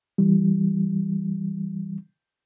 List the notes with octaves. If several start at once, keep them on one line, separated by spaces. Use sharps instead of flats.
E3 G3